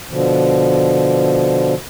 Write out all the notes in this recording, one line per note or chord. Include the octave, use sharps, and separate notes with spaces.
B2 D3 F3